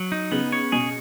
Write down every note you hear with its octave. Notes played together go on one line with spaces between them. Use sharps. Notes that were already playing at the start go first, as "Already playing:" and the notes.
Already playing: F#3
D#4
C#3 B3
C#5
B2 G#4